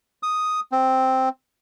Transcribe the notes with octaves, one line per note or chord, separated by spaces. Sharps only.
D#6
C4